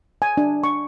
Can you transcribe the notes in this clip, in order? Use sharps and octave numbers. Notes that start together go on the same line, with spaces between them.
G#5
D4
C#6